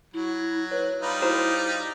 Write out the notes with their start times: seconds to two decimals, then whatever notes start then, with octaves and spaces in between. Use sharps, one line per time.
0.14 F#3 E4
0.71 B4 C#5
1.02 G3 D#4 F4 B5
1.22 E4 F#4 C5 A#5